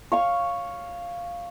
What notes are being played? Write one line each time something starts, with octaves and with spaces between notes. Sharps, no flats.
C#5 F5 C#6